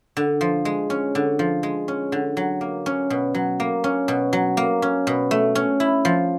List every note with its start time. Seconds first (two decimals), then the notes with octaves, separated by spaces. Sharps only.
0.17 D3
0.41 F3
0.65 G#3
0.90 C#4
1.15 D3
1.39 F3
1.63 G#3
1.88 C#4
2.12 D3
2.37 F#3
2.61 A#3
2.86 C#4
3.10 B2
3.35 F#3
3.60 A#3
3.84 C#4
4.08 B2
4.33 F#3
4.57 A#3
4.82 C#4
5.07 B2
5.31 A3
5.55 C#4
5.80 E4
6.05 F3